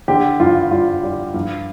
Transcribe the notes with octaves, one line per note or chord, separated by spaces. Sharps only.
D3 G4
G2 F4
G3 F4
G3
G2